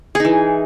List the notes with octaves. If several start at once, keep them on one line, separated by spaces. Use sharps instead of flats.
E3 D#4 G#4